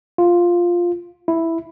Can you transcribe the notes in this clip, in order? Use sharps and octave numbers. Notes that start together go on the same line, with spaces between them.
F4
E4